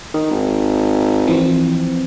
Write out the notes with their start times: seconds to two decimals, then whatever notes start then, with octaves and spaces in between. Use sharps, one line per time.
0.14 D#3
0.31 G#1
1.27 E3 F3 C4